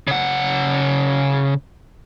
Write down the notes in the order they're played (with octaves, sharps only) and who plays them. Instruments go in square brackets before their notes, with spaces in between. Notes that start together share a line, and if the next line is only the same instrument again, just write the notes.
[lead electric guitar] C#3 F#5